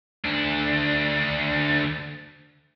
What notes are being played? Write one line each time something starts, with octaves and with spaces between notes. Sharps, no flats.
D2 D4